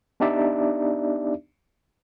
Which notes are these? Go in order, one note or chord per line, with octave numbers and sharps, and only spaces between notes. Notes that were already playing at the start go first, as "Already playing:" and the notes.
B3 D4 D#4 G4 D5 E5